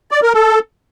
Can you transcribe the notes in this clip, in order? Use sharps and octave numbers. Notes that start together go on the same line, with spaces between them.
D5
A#4
A4